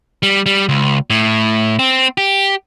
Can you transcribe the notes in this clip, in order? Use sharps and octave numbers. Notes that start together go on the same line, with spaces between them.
G3
G3
C#2
A2
C4
G4